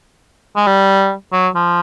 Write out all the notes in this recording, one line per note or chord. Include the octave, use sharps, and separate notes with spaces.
G#3
G3
F#3
F3